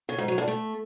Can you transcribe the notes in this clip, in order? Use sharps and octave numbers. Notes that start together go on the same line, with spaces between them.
C#3
G#2
F#3
G2
A3